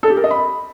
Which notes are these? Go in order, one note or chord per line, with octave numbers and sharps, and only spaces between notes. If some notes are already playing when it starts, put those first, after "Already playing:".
A4
G4
A#4
D#5
B5